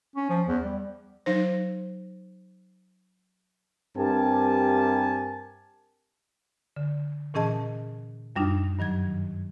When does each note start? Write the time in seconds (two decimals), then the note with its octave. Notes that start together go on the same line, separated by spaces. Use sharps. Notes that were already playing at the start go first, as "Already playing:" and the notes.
0.16 C#4
0.30 F3
0.48 E2
0.64 G3
1.26 F#3 D#4 C5
3.96 G2 C4 G4 A#4 G#5 A5
6.76 D3
7.34 A#2 E3 C#4 G#4 D#5 A5
8.36 F#2 G3 D4 D#4 F4
8.79 G2 D#3 F#3 G#6